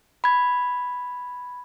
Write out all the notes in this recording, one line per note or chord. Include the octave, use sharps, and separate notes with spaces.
B5 G#6